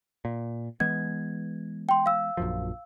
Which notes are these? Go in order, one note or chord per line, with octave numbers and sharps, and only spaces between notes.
A#2
E3 G#3 B3 G#6
G5 C6
F5 E6
A#1 F#2 F3